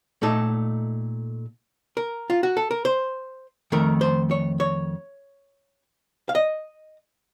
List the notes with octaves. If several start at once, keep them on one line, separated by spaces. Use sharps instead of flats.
A#2 A3 D#4 A4
A#4
F4
F#4
A4
A#4
C5
F2 D#3 A3 A#4
C5
C#5
C#5
F5
D#5